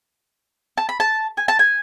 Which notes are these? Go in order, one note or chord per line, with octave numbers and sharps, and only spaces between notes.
A5
B5
A5
G#5
A5
G#5